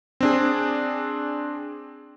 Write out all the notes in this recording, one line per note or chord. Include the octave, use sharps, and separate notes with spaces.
C4 D4 G#4